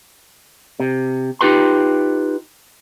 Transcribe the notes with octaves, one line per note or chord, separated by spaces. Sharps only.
C3
D#4 F4 G4 B4 C6